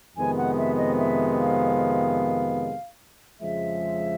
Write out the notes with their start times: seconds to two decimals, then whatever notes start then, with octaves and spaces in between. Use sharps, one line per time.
0.17 F2 C3 D#3 G#3 B3 G#5
0.37 F#5
0.58 E5
0.78 D#5
0.98 E5
1.38 F5
3.40 F2 C#3 F3 G#3 E5